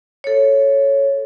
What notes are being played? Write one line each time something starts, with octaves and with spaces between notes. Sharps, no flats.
A4 C#5